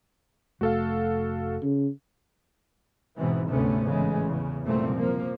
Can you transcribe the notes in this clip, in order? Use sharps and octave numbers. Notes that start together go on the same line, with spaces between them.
F1 A3 F#4 A4 F5
C#3
G#2 B2 E3 C4
D2 G#2 C3 A3 B3 C#4
A1 C#3 E3 G#3
E2 C#3
F#1 C2 A#2 A3 A#3 C4
F3 A#3